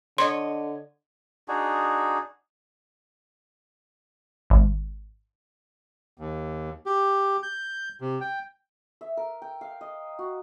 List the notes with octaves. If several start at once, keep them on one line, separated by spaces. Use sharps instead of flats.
D3 C#5 D#5 C6
D4 D#4 F#4 G#4
G#1
D#2
G4
G6
C3
G5
E5
A#4
G5
F5
D#5
F#4